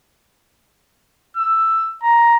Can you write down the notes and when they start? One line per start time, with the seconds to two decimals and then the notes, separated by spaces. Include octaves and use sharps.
1.37 E6
2.03 A#5